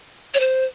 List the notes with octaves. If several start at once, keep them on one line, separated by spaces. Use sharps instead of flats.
C#5
C5